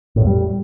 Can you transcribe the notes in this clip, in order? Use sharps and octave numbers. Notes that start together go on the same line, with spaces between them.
A2
E2
G3